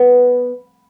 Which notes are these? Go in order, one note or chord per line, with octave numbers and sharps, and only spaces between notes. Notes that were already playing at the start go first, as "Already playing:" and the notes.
Already playing: B3